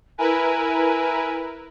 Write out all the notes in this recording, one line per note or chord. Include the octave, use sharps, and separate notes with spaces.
E4 A#4 B4 G#5